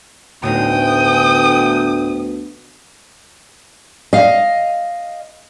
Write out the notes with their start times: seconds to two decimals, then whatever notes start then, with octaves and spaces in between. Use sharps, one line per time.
0.44 D2 A2 D3 B3 D#4 G5 D#6
4.13 D#5 F5